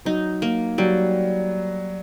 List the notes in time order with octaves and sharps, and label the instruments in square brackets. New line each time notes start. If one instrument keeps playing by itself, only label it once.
[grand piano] F#3 [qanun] D#4
[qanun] A#3
[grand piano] F#3 [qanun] G3